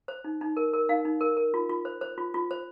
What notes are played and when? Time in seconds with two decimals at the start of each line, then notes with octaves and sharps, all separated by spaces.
0.08 C5
0.24 D#4
0.41 D#4
0.57 A#4
0.74 A#4
0.89 D#4 F5
1.05 D#4
1.21 A#4
1.37 A#4
1.54 F4
1.69 F4
1.85 C5
2.01 C5
2.18 F4
2.34 F4
2.51 C5